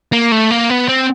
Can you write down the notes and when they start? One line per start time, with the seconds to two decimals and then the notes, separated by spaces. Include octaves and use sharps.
0.12 A#3
0.32 A3
0.51 A#3
0.70 B3
0.88 C4